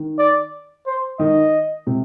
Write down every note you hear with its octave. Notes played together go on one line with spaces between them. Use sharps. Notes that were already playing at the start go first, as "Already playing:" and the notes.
Already playing: D#3
D5
C5
D#3 D#5
C3